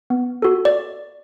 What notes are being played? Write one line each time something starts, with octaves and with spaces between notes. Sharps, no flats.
B3
F#4 A4
D5